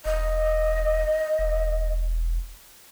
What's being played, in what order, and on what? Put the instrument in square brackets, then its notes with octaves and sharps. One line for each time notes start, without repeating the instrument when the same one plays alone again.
[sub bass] E1 [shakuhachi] D#5
[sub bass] E1